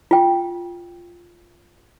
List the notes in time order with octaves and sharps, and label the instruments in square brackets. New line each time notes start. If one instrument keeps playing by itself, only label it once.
[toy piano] F4 G5